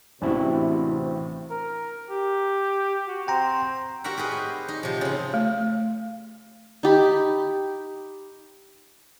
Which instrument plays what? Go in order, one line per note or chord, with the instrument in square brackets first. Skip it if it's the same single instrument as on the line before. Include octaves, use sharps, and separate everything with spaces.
[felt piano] A1 A2 [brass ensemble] C3 [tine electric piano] D4 E4 F#4 [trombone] C5
[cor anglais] A#4
G4
F#4
[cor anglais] C4 [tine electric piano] G5 A#5
[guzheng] F#4 G4 A#4 E5 F#5
G4 G#4 B4 D#5
C4
D#4
C3 F3
C#3 C4
[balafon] A3
[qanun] D#4 G4 B5